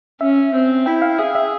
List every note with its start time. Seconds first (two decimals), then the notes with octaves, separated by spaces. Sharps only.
0.21 C#4 E5
0.53 C4
0.86 E4 G5
1.02 F5
1.18 G#4 E5
1.35 E5